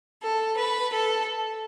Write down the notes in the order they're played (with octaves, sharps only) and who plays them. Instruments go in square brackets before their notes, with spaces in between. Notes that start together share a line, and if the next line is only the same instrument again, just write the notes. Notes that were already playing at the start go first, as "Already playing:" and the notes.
[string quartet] A4
B4
A4